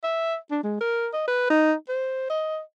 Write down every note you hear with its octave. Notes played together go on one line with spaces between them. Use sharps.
E5
D4
G#3
A#4
D#5
B4
D#4
C5
D#5